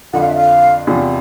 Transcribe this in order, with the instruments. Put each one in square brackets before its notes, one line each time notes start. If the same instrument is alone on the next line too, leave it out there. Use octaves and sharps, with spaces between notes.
[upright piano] F2 D3 F3 [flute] F#5
[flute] F5
E5
F5
[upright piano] E2 C3 F3